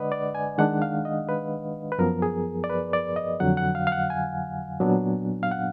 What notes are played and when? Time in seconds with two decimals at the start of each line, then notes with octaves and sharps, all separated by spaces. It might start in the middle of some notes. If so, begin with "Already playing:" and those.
Already playing: D3 G#3 D4 B4 D5 D#5 F#5
0.12 D5
0.35 G#5
0.58 D#3 G#3 D4 F#5
0.82 F5
1.05 D#5
1.29 B4
1.92 B4
1.98 F#2 F3 B3 A#4
2.22 G#4
2.64 D5
2.70 B4
2.93 D5
3.16 D#5
3.40 F2 D3 F#3 F#5
3.57 F#5
3.75 F5
3.87 F5
3.92 F#5
4.10 G#5
4.80 A#2 F#3 B3 D4
5.43 F5
5.51 F#5